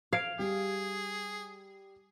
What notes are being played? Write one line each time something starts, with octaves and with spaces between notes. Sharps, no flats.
F5 G#6 D7
G3 G#4